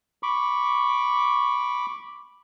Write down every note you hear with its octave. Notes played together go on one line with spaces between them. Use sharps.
B5 C#6 D6